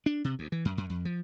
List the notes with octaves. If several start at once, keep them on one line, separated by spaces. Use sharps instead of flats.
D4
C3
D2
E3
F#2
F#2
F2
F3